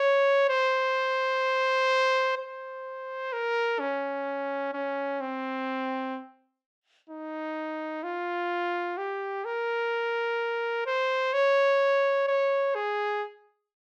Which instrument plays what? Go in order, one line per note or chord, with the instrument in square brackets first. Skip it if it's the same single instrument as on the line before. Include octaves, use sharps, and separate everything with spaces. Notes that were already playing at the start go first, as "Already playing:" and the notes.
Already playing: [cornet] C#5
C5
C5
A#4
C#4
C#4
C4
D#4
F4
G4
A#4
C5
C#5
C#5
G#4